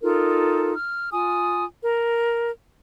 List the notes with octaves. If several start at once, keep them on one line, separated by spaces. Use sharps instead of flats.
D#4 F4 A4 A#4
F6
F4 G#5 D#6
A#4